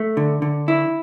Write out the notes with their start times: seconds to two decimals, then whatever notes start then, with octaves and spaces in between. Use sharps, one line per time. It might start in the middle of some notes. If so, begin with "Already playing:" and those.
Already playing: A3
0.17 D3
0.42 D3
0.68 E4